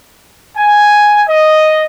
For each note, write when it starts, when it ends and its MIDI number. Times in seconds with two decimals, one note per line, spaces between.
0.57 1.23 80
1.29 1.84 75